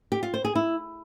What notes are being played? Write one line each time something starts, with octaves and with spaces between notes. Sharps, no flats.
G4
F4
C5
G#4
E4